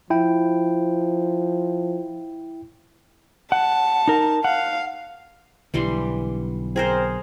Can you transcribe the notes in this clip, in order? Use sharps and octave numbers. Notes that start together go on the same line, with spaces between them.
F3 E4 G5
F#5 A5
D#4 A#4
F5 F#5
B1 D3 E3 G3 C6
C4 G#4 A#4 C5